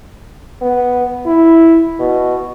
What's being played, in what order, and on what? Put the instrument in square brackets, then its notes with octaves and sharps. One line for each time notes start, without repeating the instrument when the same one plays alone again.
[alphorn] B3
E4
B2